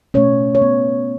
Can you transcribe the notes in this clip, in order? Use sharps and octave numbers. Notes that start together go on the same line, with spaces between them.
B2 A3 C#4 C#5
C#5
B3